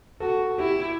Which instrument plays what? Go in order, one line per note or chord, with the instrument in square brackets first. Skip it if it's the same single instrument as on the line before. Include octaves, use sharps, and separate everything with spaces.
[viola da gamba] F#4 [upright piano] A4
[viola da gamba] E4 [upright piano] G4